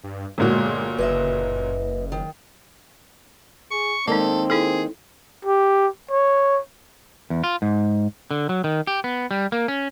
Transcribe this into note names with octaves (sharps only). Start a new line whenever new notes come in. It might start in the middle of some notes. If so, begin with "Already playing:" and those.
G2
G1 A#2 G#3 F#4
F#1 B4 D#5 E5
D#3
G#4 C#6
D#3 G#3 A#3 C4 D#4 A4
E4 G#4 A4
G4
C#5
E2
F4
G#2
D3
F#3
D#3
G4
B3
G3
A#3
C#4